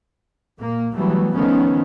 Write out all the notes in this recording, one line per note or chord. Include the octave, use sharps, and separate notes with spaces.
A#2 A#3
E3 F#3 G3 A3 B3
D#3 F3 A3 B3 C#4